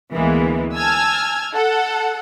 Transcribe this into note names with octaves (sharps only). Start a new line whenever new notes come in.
D2 E3 G#3 A#3 B3
G#5 A5 E6 F6 G#6
A4 F#5